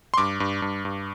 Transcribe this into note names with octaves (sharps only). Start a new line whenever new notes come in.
C6
G2 D6
G2
G2
G2